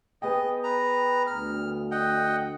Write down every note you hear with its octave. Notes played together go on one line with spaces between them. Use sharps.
B3 G#4 D#5 G5
B4 A#5
D2 F6
D#5 F#5 G5